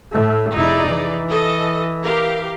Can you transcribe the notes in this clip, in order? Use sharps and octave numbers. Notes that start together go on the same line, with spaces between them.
A2 A3
F1 D#4 E4 G#4 D5
E3
A4 D#5
G4 A#4 F5